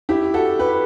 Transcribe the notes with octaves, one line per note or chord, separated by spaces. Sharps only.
E4 G4
F#4 A4
G4 B4